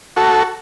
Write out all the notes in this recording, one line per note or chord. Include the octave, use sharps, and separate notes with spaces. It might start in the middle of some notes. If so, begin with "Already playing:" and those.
F#4 A4